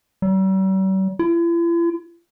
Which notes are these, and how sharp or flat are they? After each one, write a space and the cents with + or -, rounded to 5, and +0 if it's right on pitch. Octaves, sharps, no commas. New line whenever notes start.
G3 -45
E4 +45